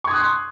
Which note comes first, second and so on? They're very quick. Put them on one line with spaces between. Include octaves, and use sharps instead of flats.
C#6 G#6 D#6 F#6 C6